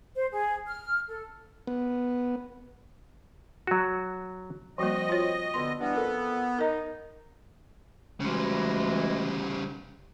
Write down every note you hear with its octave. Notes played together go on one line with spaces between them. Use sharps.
C5
G#4
F6
A4
B3
F#3 F#4
F3 G3 A#3 C4 F#4 D#5
F4 C#5
B2 D3 B3 C6
E3 G3 B3 D4
F2 A4 A#4
D#4 A#4 D#5
D2 C#3 E3 G3 G#3